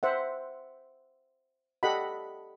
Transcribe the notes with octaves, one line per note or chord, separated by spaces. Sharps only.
C5 E5 F#5
G4 A4 D#5 F#5 B5